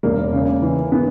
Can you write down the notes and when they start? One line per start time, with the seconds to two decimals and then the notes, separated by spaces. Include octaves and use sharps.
0.03 E1 A#3
0.33 C#3
0.62 E3
0.92 B3